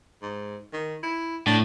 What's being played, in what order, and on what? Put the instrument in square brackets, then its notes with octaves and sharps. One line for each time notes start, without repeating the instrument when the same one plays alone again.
[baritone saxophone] G#2
D#3
E4
[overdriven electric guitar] A2 [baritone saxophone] D4